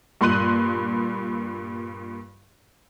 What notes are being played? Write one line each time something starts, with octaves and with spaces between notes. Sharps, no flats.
G2 A#2 B5 C6 F#6 D#7